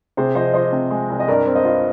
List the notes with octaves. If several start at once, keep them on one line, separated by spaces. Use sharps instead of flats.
C3 G#4 C5
F3 C5 D#5
F3 C5 D#5
C3
G#3
C2
D#5
G2 A#4 D5
C4
C5 D#5
F4